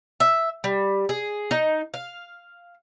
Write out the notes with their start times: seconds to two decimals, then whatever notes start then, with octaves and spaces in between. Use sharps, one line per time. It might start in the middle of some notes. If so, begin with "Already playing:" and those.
0.20 E5
0.64 G3
1.09 G#4
1.51 D#4
1.94 F5